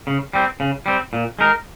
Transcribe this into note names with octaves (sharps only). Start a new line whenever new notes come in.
C#3
G3 C4
C#3
G3 C4
A#2
G#3 D#4 A#4